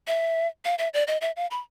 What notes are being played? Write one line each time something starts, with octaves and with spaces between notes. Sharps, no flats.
E5
F5
E5
D5
D#5
E5
F5
B5